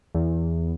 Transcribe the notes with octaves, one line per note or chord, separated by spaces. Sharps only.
E2